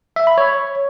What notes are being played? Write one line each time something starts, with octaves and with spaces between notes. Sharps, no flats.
E5
B5
C#5